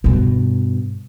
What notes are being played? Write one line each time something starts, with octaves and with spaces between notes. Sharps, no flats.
G2 B2